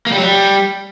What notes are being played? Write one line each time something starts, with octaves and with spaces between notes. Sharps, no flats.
A#3
G3
F#3
G3